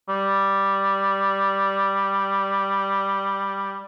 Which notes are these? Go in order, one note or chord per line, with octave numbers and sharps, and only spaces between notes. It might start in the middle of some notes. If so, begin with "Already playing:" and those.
G3